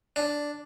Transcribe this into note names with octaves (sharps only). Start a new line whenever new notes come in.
D4